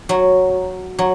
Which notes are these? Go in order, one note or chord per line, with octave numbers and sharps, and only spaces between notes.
F#3
F#3